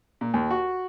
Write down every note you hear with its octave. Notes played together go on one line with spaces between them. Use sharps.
A#2
D#2
F#4